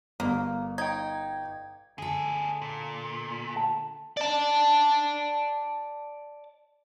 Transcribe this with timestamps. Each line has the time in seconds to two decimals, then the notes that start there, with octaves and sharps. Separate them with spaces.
0.20 G1 A#3
0.78 D#4 G5 G#6
1.98 D3 A3 G#4 A4
2.62 A#2
3.56 A5
4.17 D5 A5